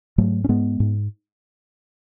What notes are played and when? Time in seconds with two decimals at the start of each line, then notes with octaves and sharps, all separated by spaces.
0.18 G#2 F#3 A3
0.44 C#4
0.49 G#2 G#3 B3
0.80 G#2